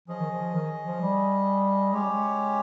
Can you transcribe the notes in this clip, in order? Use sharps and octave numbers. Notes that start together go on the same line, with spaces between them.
F3 C#4 G#4 D#5
D#3
F3
D#3
F3
G3
G#3 C#4 G4 C#5
G3
G#3